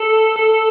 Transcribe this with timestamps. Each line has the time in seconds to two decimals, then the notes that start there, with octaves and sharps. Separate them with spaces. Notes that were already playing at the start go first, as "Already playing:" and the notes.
Already playing: A4
0.36 A4